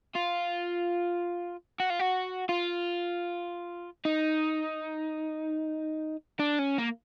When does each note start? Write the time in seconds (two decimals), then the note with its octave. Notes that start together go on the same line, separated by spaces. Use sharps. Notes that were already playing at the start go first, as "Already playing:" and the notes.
0.15 F4
1.80 F#4
1.90 F4
2.00 F#4
2.49 F4
4.05 D#4
6.39 D4
6.59 C#4
6.78 A#3